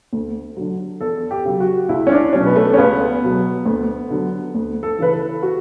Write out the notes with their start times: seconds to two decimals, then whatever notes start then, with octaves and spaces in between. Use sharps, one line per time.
0.13 D2
0.57 D3 F#3
1.01 E2 A4
1.31 G4
1.45 C#3 F#3
1.60 F#4
1.89 C#2 E4
2.07 C#4
2.11 D4
2.33 B2 F#3 C#4
2.46 B3
2.56 A3
2.74 C#4
2.78 C#2 B3
3.22 B2 F#3
3.66 D2
4.10 D3 F#3
4.55 D2
4.83 A4
4.98 C#3 E3 B4
5.13 A4
5.43 F#4